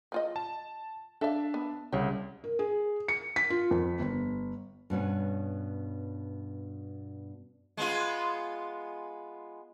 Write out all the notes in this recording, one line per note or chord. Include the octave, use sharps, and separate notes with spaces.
F3 F4 D#5
A5
D4 A4 E5 F5 A5
B3
C2 C#3 G4 C#5
A#4
G#4
C#7
B6
F4
F2
G1
G2 B2 C#4 C#5
G#3 B3 F4